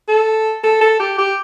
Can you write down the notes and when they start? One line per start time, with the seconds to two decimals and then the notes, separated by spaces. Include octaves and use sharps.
0.08 A4
0.63 A4
0.81 A4
0.99 G4
1.18 G4